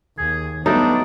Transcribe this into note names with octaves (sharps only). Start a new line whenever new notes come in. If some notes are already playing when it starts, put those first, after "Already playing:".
D#2 G#4
F#3 G3 A3 B3 D4 D#4